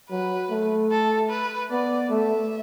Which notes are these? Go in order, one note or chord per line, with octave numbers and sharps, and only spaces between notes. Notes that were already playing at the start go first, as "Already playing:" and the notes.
F#3 B4
A3
A4
B4
B3 D5
A3 E5